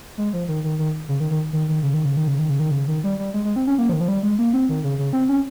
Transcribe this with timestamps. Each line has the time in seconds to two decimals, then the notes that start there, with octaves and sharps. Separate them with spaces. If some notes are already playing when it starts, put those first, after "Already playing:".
0.18 G#3
0.33 F3
0.48 D#3
0.64 D#3
0.79 D#3
1.09 C#3
1.20 D#3
1.31 D#3
1.53 D#3
1.68 D#3
1.83 C#3
1.94 D#3
2.05 C#3
2.17 D#3
2.28 C#3
2.39 D#3
2.50 C#3
2.59 D#3
2.71 C#3
2.88 D#3
3.04 G3
3.19 G3
3.34 G#3
3.45 G#3
3.56 C4
3.67 C#4
3.78 A#3
3.89 F3
3.93 D#3
4.01 F3
4.08 G3
4.23 G#3
4.39 A#3
4.53 C4
4.69 D#3
4.84 C#3
4.99 C#3
5.13 C4
5.29 C#4